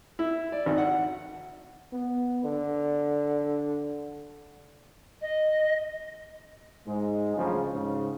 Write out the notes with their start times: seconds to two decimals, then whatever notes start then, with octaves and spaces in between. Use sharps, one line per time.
0.19 E4
0.52 D5
0.66 G#1
0.78 F#5
1.93 B3
2.44 D3
5.21 D#5
6.87 G#2 G#3
7.37 D2 C#3 F3 F#3
7.73 G#2 C#3